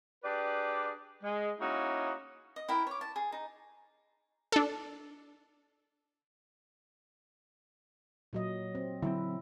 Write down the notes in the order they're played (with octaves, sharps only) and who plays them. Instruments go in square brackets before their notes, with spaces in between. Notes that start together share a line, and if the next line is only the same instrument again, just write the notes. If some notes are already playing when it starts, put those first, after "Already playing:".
[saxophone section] D4 G4 G#4 B4 D5
G#3
A#3 C#4 D#4 E4 F#4
[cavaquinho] D#5
E4 A#4 G5
C#5 D6
A5
G#4
D#4
[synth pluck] D4 A4
[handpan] A#2 F#3 D#5
C4
[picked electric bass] D3 F#3 C4 [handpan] E4